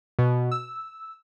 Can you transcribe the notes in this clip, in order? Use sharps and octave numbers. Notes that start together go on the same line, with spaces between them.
B2
E6